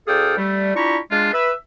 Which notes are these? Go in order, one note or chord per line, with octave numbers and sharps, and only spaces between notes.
D2 G#4 A4 D5 F5 G5
G3 A3
D4 E4 F4 G4 A#5 C#6
G#3 D4 F4
B4 E5